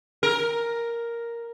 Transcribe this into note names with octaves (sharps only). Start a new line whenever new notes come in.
A#4